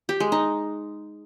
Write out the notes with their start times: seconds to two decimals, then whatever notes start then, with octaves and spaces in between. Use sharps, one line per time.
0.09 G4
0.20 G#3
0.32 D#4